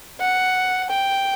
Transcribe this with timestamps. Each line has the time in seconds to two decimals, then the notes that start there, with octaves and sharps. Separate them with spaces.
0.20 F#5
0.90 G5